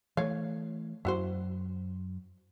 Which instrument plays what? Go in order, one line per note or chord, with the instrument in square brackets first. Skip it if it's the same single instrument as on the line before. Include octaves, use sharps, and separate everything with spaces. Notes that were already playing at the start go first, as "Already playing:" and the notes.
[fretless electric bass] E3 A3 [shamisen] C#5 F5
[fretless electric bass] F#2 [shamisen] E4 F#4 C5